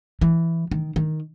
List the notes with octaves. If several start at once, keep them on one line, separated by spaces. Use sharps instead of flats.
E3
D#3
D#3